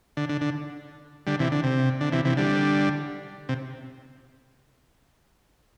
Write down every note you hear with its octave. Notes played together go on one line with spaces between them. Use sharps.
D3
D3
D3
D3 G3
C3 E3
D3
C3
D3
C3 E3
C3 E3
D3 G3
C3